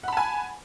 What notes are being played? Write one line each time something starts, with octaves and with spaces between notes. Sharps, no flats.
F#5 G#5 A5 B5